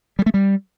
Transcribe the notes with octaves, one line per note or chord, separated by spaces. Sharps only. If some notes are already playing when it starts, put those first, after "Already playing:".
G3
A3
G3